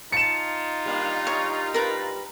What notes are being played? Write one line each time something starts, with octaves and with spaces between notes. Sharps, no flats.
D#4 F4 A5 C#7 E7
G3 A#3 D4
C#5
A#4 B4 A#5